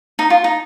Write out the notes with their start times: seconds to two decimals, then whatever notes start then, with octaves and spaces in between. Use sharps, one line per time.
0.19 D#4
0.30 F4
0.44 D#4